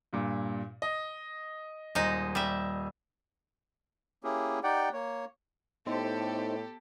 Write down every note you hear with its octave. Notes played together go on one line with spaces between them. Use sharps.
G2 A#2
D#5
D#1 G#3 D#4 C5 D#5
G3 E5
A#3 C#4 E4 G4 G#4
D#4 G4 D5 F#5 G5
A#3 C#5
A2 B3 D#4 G4 A4 C5